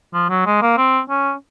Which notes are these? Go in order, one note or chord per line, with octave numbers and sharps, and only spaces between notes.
F3
F#3
G#3
A#3
C4
C#4